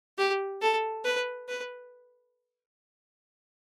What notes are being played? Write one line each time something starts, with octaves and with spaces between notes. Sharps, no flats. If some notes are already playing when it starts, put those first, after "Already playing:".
G4
A4
B4
B4